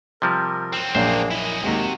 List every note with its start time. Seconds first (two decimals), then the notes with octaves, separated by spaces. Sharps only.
0.22 C3 F3 G3 A#4
0.73 F#3 C4
0.95 A#1 F#2 A#3 D4 G#4 C5
1.31 E4 D#5 G#5
1.64 D#2 C3 G#3 F#4